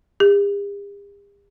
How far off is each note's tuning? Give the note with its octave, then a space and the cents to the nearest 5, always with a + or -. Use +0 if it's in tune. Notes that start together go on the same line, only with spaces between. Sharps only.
G4 +45